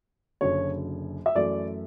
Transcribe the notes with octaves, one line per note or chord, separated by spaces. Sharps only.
F#1 F#2 D3 C#5
E5
F#2 E3 A3 D5